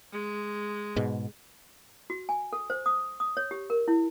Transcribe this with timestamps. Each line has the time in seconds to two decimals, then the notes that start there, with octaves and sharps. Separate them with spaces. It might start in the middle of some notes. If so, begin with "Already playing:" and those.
0.12 G#3
0.96 G#2 B2
2.10 F#4
2.29 G#5
2.53 A4
2.70 C5
2.86 D#6
3.20 D#6
3.37 C#5
3.51 G4
3.70 A#4
3.88 E4